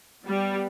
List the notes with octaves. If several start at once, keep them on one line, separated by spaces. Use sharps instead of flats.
G3 B3